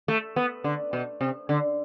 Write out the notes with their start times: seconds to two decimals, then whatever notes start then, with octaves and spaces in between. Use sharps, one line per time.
0.08 A3
0.36 B3
0.64 D3
0.93 B2
1.21 C3
1.49 D3